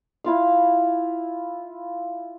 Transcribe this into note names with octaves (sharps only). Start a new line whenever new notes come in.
E4 F4 F5